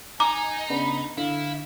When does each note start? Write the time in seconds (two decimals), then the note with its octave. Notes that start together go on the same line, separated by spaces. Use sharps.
0.20 D#4 G#5 A#5 D6
0.70 C#3 B3 D4 B5
1.18 D3 E4 F5